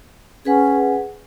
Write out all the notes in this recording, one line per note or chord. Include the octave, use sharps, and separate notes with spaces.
C#4 G#4 B4 F#5